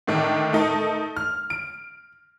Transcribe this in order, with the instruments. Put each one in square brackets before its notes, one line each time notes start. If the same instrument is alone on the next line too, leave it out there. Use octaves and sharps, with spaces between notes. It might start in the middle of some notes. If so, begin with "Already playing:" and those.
[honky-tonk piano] A2 D3 D#3 D4
A3 D#4 A4 A#4
F6
D7